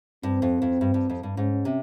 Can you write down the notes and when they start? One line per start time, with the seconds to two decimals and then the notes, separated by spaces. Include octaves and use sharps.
0.23 G2 C4
0.42 F2
0.62 F2
0.81 G2
0.94 G2
1.10 F2
1.23 G2
1.37 G#2 C#4
1.65 C3